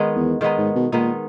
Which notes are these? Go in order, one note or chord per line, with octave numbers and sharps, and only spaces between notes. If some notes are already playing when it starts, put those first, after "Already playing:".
Already playing: D#3 G#3 B3 D#4
E2
D#3 G#3 B3 D#4
G#2
B2
A#2 D#3 G#3 B3 D#4